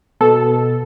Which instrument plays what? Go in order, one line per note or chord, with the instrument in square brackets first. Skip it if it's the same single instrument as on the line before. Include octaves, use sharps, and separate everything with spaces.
[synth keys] B2 A4